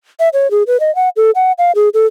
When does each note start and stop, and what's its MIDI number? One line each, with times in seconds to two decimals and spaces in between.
0.20 0.29 76
0.33 0.50 73
0.51 0.63 68
0.67 0.80 71
0.80 0.94 75
0.95 1.09 78
1.16 1.31 69
1.35 1.52 78
1.58 1.72 77
1.75 1.89 68
1.94 2.06 69